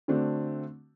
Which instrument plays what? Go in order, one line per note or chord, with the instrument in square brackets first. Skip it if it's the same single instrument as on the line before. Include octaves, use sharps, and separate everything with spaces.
[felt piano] D3 A3 C4 D4 F#4